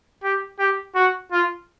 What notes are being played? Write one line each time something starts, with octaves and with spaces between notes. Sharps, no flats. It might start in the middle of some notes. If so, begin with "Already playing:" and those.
G4
G4
F#4
F4